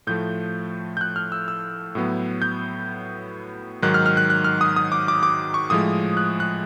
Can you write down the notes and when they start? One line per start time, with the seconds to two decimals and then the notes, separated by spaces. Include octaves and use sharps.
0.07 A2 F3 A3 G6
0.97 G6
1.01 F#6
1.16 F6
1.32 E6
1.48 E6
1.95 A2 F#3 B3
2.42 G6
3.82 G#2 D#3 F#3 F#6
3.94 F6
4.06 F6
4.17 F#6
4.30 F#6
4.44 F6
4.61 D#6
4.76 D#6
4.92 D6
5.08 D6
5.23 D6
5.54 C#6
5.70 A2 F3 G#3 D#6
6.17 F#6
6.40 F#6